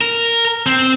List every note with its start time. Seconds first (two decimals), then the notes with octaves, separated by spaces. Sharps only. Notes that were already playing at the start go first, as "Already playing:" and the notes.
0.01 A#4
0.66 C4